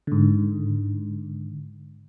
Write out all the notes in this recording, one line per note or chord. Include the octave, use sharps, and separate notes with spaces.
G#2 D3